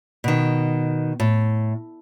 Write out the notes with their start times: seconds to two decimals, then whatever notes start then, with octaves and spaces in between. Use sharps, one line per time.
0.24 B2 D#3
1.20 A2